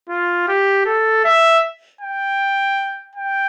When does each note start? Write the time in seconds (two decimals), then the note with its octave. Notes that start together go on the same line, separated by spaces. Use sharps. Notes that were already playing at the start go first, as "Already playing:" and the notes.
0.09 F4
0.48 G4
0.86 A4
1.24 E5
2.01 G5
3.15 G5